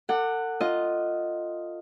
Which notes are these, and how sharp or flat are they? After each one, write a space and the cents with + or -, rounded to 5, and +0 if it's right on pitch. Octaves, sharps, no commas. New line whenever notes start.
A4 +45 F#5 +0 D6 +20
F4 +0 D#5 +0